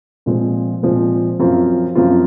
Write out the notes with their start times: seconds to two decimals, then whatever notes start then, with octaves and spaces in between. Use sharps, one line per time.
0.26 A#2 F3 G#3 C4
0.83 A#2 F3 G#3 C4
1.39 F#2 F3 C4 F4
1.95 F#2 F3 C4 F4